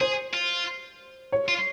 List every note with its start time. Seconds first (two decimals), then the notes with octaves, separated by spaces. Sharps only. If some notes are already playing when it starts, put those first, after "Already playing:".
0.01 G#4 C5
0.33 F4
1.32 C#5
1.48 F4